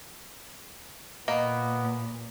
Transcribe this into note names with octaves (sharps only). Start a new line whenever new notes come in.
A#2 A#3 B3 D#5